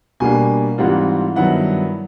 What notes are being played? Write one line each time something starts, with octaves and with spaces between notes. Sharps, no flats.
B2 G3 A#3 D4 G#5
G#2 E3 G3 C4 F4 F#5
G2 D#3 F#3 B3 E4 F#5